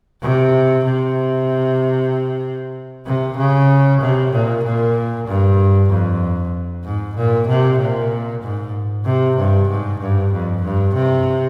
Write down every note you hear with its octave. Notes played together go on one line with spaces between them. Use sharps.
C3
C3
C3
C#3
C3
A#2
A#2
G2
F2
G#2
A#2
C3
A#2
G#2
C3
G2
G#2
G2
F2
G2
C3